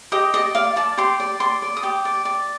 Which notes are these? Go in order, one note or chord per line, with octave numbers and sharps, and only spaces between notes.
G4 D#5
D5 D#5
D5 F5
D5 A5
G4 C6
D5
D5 C6
D5
D#6
G4 D6
D5
D5